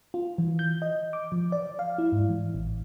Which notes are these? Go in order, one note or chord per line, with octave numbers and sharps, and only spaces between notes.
F4
E3
G6
D#5
D6
F3
D5
F5
E4
G#2
E3
A1